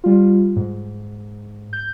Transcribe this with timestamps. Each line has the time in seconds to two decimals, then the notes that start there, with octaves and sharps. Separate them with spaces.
0.04 G3 F4
0.56 G#2
1.73 G6